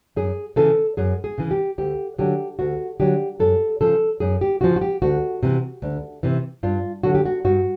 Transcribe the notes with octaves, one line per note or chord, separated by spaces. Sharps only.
F#2 G#4
C#3 E3 A4
F#2 G#4
G#4
C#3 E3
G4
D2 G4
D3 F#3 G4
D2 F#4
D3 F#3 G4
F#2 A4
C#3 F3 A4
F#2 G#4
G4
C#3 F3 F#4
F#4
G4
D2 F#4
C3 E3
D2
C3 E3
G2 F4
D3 F#3 F#4
G4
F#4
G2 F#4